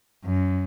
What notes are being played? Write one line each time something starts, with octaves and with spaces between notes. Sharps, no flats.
F#2